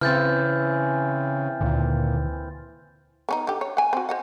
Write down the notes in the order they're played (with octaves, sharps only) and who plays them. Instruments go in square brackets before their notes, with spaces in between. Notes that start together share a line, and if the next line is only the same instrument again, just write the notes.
[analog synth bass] C#3 [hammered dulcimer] E3 C4 [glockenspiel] F6 G6 A6
[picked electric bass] D2 D3 D#3 [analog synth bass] A#2
[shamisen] B3 C#4 D#4
D3 G4
C#5
F#5 G#5
C4 F#4
C5 D#5 F#5